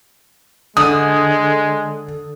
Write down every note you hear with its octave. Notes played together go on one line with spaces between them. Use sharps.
D3 G#3 D#6